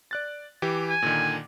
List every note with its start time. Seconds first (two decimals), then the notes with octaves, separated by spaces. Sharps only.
0.11 D5 F#6 A6
0.62 E3 G4 D6
0.89 G#5
1.02 A#2 D3 D#3